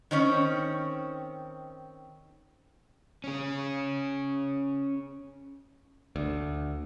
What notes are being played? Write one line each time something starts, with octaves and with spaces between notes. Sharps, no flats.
D#3 C4 C#4
C#4 G#4
D2